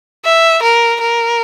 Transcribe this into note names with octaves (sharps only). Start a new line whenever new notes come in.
E5
A#4
A#4